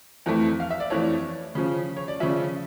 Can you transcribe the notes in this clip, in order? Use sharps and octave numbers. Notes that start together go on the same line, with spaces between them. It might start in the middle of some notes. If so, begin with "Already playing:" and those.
F2 E3 A3
F5
E5
D5
F2 E3 A3 C#5
C#3 F3 C#4
C#5
D5
C#3 F3 C#4 E5